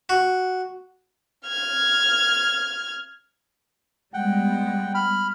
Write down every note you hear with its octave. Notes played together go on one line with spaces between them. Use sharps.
F#4
F6 G#6
G3 G#3 B3 F#5 G5
B5 F6